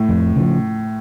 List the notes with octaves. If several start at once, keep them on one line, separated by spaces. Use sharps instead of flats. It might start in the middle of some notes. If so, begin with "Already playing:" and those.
Already playing: A2
F2
C#3 F3